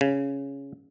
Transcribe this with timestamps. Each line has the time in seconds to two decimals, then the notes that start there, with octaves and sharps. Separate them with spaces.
0.01 C#3